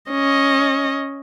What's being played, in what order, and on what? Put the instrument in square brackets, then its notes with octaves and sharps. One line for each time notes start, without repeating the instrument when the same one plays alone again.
[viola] C#4 D#5